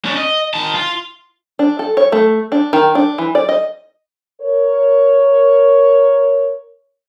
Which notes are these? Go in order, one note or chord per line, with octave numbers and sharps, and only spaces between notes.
C#4 D4
D#5
D#3 A5
F4
D4
A4
C#5
A3
D4
D#3
D4
E3
D5
D#5
A#4 C#5